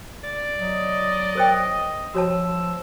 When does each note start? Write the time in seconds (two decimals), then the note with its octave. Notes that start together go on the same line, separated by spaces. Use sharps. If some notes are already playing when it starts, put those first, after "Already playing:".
0.24 D5
0.60 F#3 D#5
1.35 A#4 C5 G5
2.15 F3 F#4 C#5 A5 E6